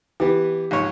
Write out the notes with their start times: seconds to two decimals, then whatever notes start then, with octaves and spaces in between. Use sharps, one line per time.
0.20 E3 B3 G4
0.71 A#1 G#2 C#5